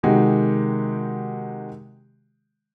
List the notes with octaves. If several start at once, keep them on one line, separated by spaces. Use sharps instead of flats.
C3 D#3 G#3 F#4 G4